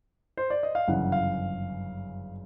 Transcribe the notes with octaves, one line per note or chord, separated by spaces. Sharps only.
C5
D5
D#5
F5
G1 F#2 C#3 E3 F#5
F5